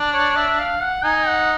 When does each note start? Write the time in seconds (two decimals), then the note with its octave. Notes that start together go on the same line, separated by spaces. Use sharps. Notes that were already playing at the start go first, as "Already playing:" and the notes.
Already playing: D4
0.13 C#5
0.36 E5
0.59 F5
0.82 F#5
1.04 D#4 G#5
1.27 F#5